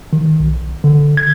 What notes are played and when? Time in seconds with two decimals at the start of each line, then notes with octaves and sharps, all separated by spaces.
0.13 D#3
0.40 B1
0.84 D3
1.17 G#6